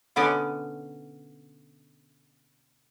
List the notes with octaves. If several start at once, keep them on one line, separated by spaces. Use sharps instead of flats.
B2 D3 B3 C#4 D5 D#5